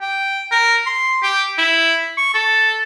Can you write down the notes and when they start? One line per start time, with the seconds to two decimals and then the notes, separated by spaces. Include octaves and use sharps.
0.01 G5
0.51 A#4
0.86 C6
1.23 G4
1.58 E4
2.17 C#6
2.34 A4